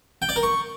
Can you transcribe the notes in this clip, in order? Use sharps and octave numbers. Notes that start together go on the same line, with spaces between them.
G5
D5
A#4
C#6